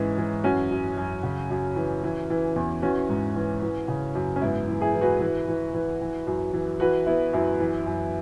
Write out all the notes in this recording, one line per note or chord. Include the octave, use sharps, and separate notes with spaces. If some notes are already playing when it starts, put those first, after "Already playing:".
Already playing: G#2 E3 G#3 C#4
E3
F#2 C#4 F#4
F#2
F#2
C#3
F#2
E3
E3
E3
E2
E3 C#4 F#4
G#2
E3
E3
C#3
F#2
C#4
G#2 B3 E4
E3
E4 G#4
E3
F#4 B4
E3
E3
E3
E3
F#2
E3
E3 F#4 B4
E3 B3 E4
F#2 B3 E4
E3
F#2